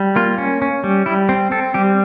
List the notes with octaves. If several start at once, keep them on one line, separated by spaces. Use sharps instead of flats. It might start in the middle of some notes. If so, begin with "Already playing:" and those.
Already playing: G3
A#3 F4
C#4
C#4
G3
G3 E4
C4
C4 A4
G3 G4